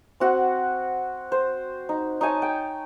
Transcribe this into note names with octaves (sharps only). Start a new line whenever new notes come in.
C4 F#4 F#5
C5
D#4
D#4 C#5 G#5 A5
G5